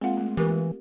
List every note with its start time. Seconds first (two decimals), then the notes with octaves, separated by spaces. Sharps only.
0.01 G#3 A#3 C4 F4 F#5
0.17 A3
0.37 E3 G4 A#4